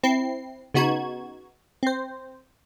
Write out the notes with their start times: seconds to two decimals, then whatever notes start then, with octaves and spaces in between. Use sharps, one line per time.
0.04 C4 E4 C7
0.74 C#3 B3 D#4 F#4 G#6
1.83 C4 C5